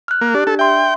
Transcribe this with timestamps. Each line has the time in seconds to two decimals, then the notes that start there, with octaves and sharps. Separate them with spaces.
0.08 F6 F#6
0.21 A#3
0.34 D4 G4
0.47 D4 A4
0.59 E5 G5 C6